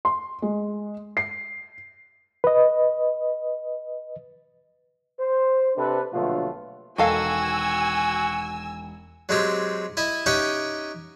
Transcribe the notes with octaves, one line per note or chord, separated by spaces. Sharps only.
C6
G#3
C7
B4 D#5
C5
C3 D4 A4 B4
A#1 B2 D3 F#3 A3 F4
E1 D#3 F#4 A4 F5 G#5 E6
F#3 G#3 C4 G4
E4 D#5 E5
C#4 D#4 G4 E5 F#5 G5